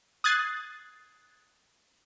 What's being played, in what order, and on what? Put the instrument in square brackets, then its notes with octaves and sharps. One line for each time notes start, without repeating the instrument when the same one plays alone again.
[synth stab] D#6 F#6 G#6 A6 C7